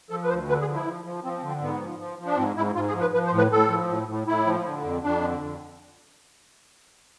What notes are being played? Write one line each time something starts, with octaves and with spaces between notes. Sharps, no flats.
F3 A4
B4
D2 C5
D3 B4
G#4
F3
E4
F3
F3
F3 C4
C4
D3
C4
G#2 B3
F3
F3
F3
D4
G#2 C4
G#2 E4
G#2 F4
G#4
F3
B4
F3 B4
C5
A2
B4
A2 A4
F3
A2
A2
A2 E4
F3
D3
F2
F2 D4
D3
F2